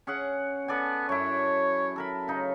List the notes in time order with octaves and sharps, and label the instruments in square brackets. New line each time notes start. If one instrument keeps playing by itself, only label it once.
[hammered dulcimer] C#4 G#4 F#5
[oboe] B3 [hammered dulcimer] A4 D5 G#5
[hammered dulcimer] F#2 E4 [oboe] C#5
[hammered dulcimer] A4 A#4 B5
C#3 D#4